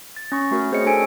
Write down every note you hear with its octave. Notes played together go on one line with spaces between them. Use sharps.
A6
C#4 C#6
A3 F#4 A#4
C4 G#4 C5 C#5 D#5 C#7
A3 D4 G#4 A4 G#5 D7